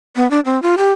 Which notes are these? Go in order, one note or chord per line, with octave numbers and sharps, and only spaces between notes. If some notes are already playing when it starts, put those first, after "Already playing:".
B3
D4
C4
F4
G4